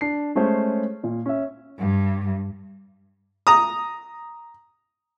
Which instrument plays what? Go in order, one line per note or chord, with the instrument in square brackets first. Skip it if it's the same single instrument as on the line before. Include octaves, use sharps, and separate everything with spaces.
[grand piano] D4 C7
G#3 A3 C#4 G#4 C5 C#5
A#2
C#4 E5
[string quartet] G2
[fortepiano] A#5 D#6